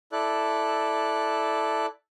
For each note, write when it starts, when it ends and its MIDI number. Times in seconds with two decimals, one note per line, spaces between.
0.12 1.86 64
0.12 1.86 69
0.12 1.86 74
0.12 1.86 90